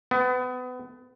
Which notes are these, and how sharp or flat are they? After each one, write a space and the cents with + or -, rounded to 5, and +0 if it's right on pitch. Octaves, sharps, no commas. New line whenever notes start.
B3 +30